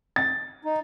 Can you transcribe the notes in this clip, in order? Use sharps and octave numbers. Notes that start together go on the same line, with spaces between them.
A6
D#4